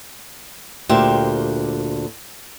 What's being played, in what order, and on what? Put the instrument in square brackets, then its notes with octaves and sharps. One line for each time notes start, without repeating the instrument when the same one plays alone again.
[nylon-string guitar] D2 A#2 G4 C5 E5